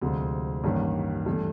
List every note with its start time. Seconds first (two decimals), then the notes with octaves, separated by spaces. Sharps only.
0.02 D2 C3 F3 G#3
0.64 A1 G2 D#3 G3 A#3
1.26 G2 E3 A3